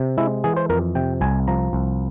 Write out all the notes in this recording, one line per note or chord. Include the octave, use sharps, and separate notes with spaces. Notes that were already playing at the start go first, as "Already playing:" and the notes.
Already playing: C3
G#3 E4
E3 G#4
C5
F2 A#4
C3 G5
C2 G#5
F3 A#5
C2